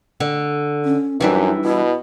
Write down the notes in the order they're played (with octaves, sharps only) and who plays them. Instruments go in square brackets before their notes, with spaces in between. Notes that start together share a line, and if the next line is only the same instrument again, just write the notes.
[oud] D3
[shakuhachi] C#4
[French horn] F#2 [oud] E3 G3 D4 [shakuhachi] D#4
[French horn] B2 [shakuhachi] E4